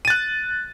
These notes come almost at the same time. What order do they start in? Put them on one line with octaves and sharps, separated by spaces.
D#7 A6 F#6